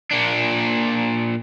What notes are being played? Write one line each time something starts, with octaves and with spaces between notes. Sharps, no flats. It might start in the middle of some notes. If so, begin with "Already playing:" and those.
A#2 D4